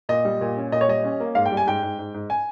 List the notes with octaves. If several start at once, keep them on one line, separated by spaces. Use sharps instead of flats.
A#2 D#5
G3
A#2
C#4
A#2 D#5
C#5
G3 D#5
C#4
A#3
G#2 F5
G5
G3
G#5
G#2 G5
G#2
G#2
G#2
G#5